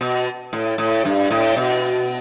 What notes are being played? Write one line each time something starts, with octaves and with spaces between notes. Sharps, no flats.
B2
A2
A2
G2
A2
B2